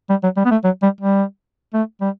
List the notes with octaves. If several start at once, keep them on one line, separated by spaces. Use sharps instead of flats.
G3
F#3
G3
B3
A3
F#3
G3
G3
A3
G3